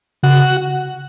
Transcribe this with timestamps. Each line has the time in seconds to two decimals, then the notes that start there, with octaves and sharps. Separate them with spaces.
0.23 C#3 F#4